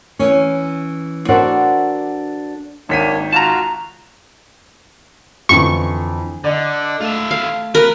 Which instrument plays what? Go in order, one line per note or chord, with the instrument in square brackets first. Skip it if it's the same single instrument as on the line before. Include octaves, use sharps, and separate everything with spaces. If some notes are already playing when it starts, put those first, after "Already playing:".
[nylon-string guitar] E3 C#4
D4 F#4 A4 A#4 C5 D5
[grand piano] G#1 B6 D#7 [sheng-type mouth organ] A#3 D4 C#5
[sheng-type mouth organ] F4 F#4 [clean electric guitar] A5 A#5
[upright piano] F2 D3 E3 [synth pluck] C#6
[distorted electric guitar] D3 [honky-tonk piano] D5 D#5
[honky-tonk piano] A3 [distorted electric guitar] F4 E5
[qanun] F5
[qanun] A#4 [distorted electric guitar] B4